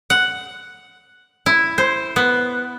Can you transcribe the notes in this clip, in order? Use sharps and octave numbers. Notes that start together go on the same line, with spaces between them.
F#5
E4
C5
B3